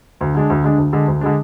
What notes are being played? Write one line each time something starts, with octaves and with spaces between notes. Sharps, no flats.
D2
D3 G#3 D4
D2
D3 G#3 D4
D2
D3 G#3 D4
D2
D3 G#3 D4